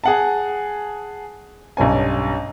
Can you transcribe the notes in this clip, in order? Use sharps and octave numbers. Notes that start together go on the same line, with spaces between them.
G#4 F#5 A5
B1 G2 C#4 G#5